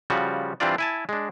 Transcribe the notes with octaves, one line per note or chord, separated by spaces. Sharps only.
C#3 F3 G3 F#4
E3 G3 C4 D4 F4 D5
E4 G#5 A5
G#3 D4